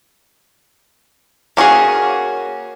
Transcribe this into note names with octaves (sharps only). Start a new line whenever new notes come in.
A#3 C#4 F#4 G#4